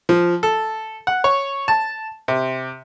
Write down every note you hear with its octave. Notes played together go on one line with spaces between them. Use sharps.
F3
A4
F#5
C#5
A5
C3